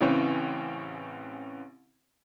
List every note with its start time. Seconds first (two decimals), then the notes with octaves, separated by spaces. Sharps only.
0.01 A1 C#3 E3 C4 C#4